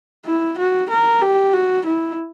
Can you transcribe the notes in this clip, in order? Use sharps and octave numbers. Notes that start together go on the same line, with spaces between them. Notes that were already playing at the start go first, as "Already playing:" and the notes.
E4
F#4
A#4
G4
F#4
E4